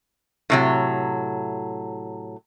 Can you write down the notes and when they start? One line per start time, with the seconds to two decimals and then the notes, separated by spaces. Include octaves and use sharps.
0.50 A2 C3 F#3